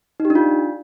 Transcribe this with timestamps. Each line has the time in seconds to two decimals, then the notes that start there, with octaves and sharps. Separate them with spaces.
0.20 D#4
0.25 G4
0.30 D4
0.35 F4